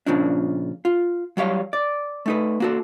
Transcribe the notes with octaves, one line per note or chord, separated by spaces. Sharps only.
A#2 C#3 F3 D4
F4
F#3 G3 C#5 F5
D5
A3 D#4 B4
A#3 F#4 A4